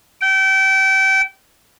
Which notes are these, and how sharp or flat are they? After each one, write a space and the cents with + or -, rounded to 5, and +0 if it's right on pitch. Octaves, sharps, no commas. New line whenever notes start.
G5 -30